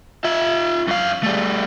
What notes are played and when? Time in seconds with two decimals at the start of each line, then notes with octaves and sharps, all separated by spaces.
0.24 F4 E5
0.88 F#2 F5
1.23 G3 A3